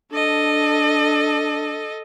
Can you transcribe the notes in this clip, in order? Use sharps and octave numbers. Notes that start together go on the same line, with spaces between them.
D4 A4 D#5